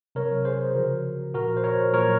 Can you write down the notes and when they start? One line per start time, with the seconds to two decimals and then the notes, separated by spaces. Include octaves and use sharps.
0.15 C3 F#3 A#4 C#5
0.45 G#4 C5
0.74 C#3 F3 F#4 A#4
1.34 A#2 F3 F#4 A#4
1.57 C5
1.64 A#4 C#5
1.93 A#2 F#3 A#4 C#5